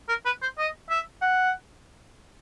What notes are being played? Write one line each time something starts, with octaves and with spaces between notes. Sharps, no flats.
A#4
B4
C5
D#5
E5
F#5